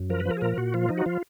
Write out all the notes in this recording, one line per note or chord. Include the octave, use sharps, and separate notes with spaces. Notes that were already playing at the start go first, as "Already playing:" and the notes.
Already playing: F#2
F3 A#4
B4
F3
A#4
G#4
A#2 A#4
A#2 F#4
F3 F4
F3 D#4
F#4
F3 F4